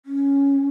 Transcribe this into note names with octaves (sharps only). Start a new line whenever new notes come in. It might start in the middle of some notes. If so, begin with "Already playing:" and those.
C#4